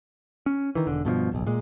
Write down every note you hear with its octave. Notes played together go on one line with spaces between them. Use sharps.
C#4
D#3 E3
E1 D3
G2 B2 E3 F3
D1 B1
A#2 G#3